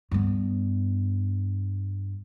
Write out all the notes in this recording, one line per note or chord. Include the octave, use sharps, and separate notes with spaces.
G2 B3